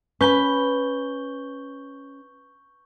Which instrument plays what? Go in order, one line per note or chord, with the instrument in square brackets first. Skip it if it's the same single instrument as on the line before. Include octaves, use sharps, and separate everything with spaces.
[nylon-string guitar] C#4 [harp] B4 B5 [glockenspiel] C#6 G6 G7